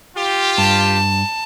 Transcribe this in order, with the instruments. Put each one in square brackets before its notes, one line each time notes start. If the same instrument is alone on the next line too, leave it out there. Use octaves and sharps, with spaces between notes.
[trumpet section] F4 G4
[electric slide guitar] G2 [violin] A5